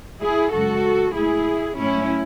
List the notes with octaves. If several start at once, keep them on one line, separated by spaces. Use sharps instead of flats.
E4 G#4
F#2 C#3 G#3 F#4 A4
A2 G#3 E4 G#4
A2 F#3 A3 C#4 E4